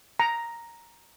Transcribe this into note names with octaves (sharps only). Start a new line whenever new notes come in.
A#5